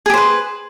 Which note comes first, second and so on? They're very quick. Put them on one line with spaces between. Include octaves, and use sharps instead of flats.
G#4 G4 C5 B4